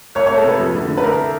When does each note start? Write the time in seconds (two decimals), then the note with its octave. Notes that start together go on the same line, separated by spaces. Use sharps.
0.15 C2 C#5
0.26 C#5
0.30 C2
0.37 A4
0.44 C3 B4
0.60 F2
0.75 D3
0.89 D3
0.97 B4
1.04 C2 A#4